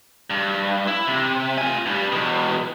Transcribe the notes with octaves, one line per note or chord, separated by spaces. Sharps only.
G2
E4
C3
F4 G#5
G2 G3
E2 B2